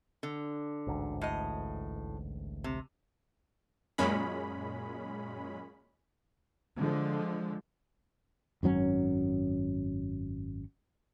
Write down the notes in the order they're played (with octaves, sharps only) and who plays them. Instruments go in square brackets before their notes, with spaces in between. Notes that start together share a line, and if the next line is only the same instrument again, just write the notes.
[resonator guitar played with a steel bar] D3
[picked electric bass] A1 D2 G#2
[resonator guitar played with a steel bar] A2 D#5
C3
[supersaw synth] F#2 A#2 G#3 C#4 B5
[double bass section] D3 F3 G#3
[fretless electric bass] G#1 F#2 F#3 C#4